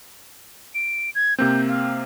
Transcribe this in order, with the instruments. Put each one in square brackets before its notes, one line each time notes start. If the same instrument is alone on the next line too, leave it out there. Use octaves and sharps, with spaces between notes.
[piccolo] D7
G#6
[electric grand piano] C3 A#3 C4 [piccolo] G6
[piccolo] F5